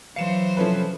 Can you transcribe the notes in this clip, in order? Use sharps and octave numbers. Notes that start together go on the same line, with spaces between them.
E3 F#3 C5 F5 C#7 E7
C3 F3 C#4 E4 A4 B4